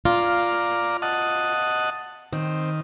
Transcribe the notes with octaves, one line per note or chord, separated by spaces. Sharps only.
F4 D5 F5 A#5
D#5 F#5 A5
D#3 C4